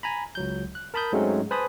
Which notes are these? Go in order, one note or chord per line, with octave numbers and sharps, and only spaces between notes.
G#5 A#5 B5
C#2 F#3 G6
F#6
A#4 A5 B5 D#6 G6
G#2 F#3 G#3 A3 C4 C#4
B4 C5 G#5 A5 B5 D#6